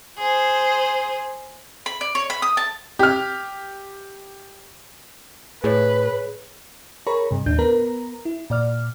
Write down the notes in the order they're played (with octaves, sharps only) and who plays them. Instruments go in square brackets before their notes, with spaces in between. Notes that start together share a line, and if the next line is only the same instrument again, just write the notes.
[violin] G#4 C5
[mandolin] B5
D5
C#5
B5
D#6
A5
[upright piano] G4 F6
[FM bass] A2 [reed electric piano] G#4 C#5 [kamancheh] B4
[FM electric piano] G#4 A#4 C#5 A#5 B5 C#6
G2 C3
D#2 A2 D4 G6
B3 A#4 B4 A#5
E4
A#2 D5 F6